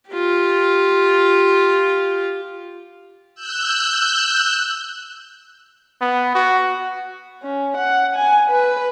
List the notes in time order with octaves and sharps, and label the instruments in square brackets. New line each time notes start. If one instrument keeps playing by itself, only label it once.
[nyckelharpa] F4 G4
[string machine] E6 F#6 G6
[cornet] B3
F#4
[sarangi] C#4
F#5
G#5
B4